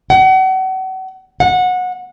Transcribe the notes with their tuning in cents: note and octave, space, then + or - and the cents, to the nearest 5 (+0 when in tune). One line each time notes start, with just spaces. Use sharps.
F#5 +35
F#5 -20